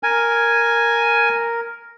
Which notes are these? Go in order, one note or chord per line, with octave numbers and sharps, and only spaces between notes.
A#4 G#5